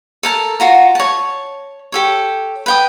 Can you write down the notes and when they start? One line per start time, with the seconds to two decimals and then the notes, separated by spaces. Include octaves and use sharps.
0.23 A4 A#4 A5
0.60 F4 F#4 A#5
0.95 C#5 A5
1.92 G4 A4 C#5
2.66 B4 G5 D#6